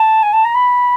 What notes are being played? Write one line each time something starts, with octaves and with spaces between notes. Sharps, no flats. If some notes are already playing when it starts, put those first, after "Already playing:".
Already playing: A5
G#5
A5
A#5
B5